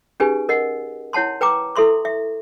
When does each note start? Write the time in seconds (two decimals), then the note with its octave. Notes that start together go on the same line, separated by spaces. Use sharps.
0.20 C#4 D#4 G4 G#4 B4 G#5
0.49 A#4 D#5 F#5
1.13 E4 C#5 F#5 A5 C6
1.41 B4 G5 A#5 D6
1.76 E4 A4 E5 C6 C#6
2.05 E5